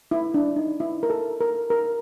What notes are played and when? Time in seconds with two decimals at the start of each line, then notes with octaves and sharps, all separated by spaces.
0.11 E4
0.34 D4
0.56 D#4
0.80 E4
1.03 A#4
1.10 A4
1.41 A#4
1.70 A#4